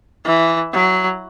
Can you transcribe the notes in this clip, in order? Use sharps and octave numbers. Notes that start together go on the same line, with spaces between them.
E3
F#3